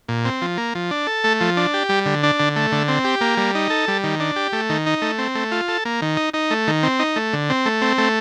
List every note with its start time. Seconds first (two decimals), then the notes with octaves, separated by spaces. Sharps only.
0.08 A#2
0.25 C4
0.42 F3
0.58 A#3
0.75 F3
0.91 D4
1.07 A4
1.24 A3
1.41 F3
1.57 D4
1.74 G4
1.89 G3
2.06 D3
2.23 D4
2.40 D3
2.56 A3
2.72 D3
2.88 C4
3.04 G4
3.21 A#3
3.37 G3
3.55 D#4
3.70 A4
3.88 G3
4.04 D#3
4.20 D4
4.36 G4
4.53 A3
4.69 D#3
4.86 D#4
5.02 A3
5.18 C4
5.35 A3
5.52 F4
5.68 A4
5.85 A#3
6.02 D#3
6.17 D#4
6.34 D#4
6.51 A3
6.68 D#3
6.83 C4
7.00 D#4
7.16 A3
7.33 D3
7.50 C4
7.66 A3
7.82 C4
7.98 A3